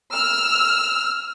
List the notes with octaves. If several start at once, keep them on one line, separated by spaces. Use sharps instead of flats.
E6 F6